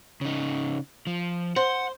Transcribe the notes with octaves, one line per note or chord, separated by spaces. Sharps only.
C#3 D#4
F3
C5 F#5